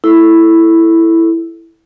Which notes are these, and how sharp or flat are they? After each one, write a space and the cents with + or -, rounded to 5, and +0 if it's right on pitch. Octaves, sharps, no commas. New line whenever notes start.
E4 +0 A4 +0